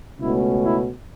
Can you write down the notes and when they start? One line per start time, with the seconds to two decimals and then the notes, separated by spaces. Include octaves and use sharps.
0.20 C#2 B2 A3 C#4 E4
0.64 E4